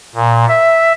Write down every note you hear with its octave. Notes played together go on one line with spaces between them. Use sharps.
A#2
E5